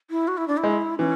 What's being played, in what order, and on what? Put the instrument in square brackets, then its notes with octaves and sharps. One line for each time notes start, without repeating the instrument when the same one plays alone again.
[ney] E4
F#4
E4
D4
E4
[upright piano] G#3
[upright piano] E3 [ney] C#4